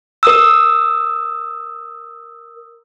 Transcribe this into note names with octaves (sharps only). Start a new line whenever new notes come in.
A#4 D#6 E6